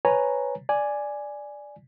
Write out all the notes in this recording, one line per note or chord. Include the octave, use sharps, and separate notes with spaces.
B4 C#5 G#5 A#5
D5 G#5